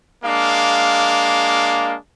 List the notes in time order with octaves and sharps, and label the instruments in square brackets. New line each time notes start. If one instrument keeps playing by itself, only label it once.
[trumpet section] G#3 A#3 D4 F5